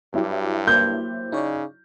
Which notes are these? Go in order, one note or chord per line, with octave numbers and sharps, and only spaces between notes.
G2 F#3 E4 G4
A#3 C5 G6
C#3 D#4 C#5 D5